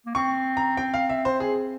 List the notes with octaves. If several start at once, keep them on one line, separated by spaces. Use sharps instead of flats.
A#3
C4 C#6
A#5
G5
F5
E5
C5
G#4